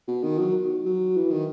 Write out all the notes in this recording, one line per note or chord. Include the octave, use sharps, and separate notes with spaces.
B2
D#3
F#3
F#3
E3
D#3